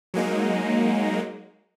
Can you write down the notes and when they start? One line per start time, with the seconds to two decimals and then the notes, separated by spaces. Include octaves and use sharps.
0.14 F#3 G#3 A#3 D#4